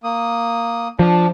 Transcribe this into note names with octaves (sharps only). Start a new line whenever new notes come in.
A#3 D#6
F3 D4